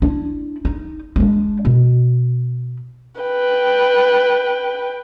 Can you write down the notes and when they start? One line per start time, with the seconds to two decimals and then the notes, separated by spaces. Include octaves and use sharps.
0.02 D4 E4
0.65 D#4
1.16 G#3 D4
1.65 B2
3.22 B4 G5